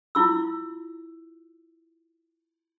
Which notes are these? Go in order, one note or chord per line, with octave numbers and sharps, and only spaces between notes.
E4 F4 E6